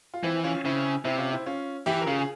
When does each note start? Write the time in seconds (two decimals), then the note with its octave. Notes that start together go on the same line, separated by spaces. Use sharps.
0.14 F4
0.23 E3 C4 E4
0.44 C#4 F4
0.65 C#3 C4 E4
1.05 C3 C4 E4
1.18 C#4 F4
1.32 C4 E4
1.46 C#4 F4
1.86 E3 E4 G4
2.02 A#4
2.06 C#3 F4 G#4
2.18 G#4